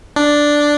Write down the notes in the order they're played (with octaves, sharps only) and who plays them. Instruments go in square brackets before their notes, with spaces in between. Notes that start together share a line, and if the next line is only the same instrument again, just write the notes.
[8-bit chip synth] D4